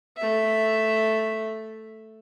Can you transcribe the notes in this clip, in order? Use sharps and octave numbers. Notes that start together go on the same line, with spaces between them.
A3 E5